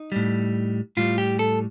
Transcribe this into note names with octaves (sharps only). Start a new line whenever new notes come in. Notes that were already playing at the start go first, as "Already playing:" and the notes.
Already playing: D#4
A2 G3
A2 G3 F4
G4
A4